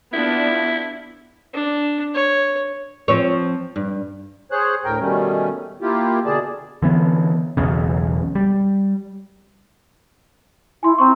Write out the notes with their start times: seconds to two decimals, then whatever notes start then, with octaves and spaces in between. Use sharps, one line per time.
0.13 B3 D4 E4 F4
1.54 D4
2.15 C#5
3.08 F3 C4 C#5
3.76 G2
4.52 G#4 C5 C#5 F#6
4.85 D2 A2 A#4 G5
5.00 B2 D#3 G3 A3 C#4
5.82 A#3 E4 F4 G4
6.26 B2 D3 G#4 D5 A5
6.82 D3 E3 B3
7.57 E1 B1 E2 C#3
8.35 G3
10.83 E4 G#5 C6
10.98 C4 A#5 C6 C#6